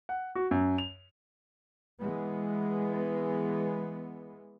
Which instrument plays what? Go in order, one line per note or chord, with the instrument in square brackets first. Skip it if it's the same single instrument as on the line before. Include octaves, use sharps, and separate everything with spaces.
[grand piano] F#5
F#4
F#2
F7
[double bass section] E3 G#3 B3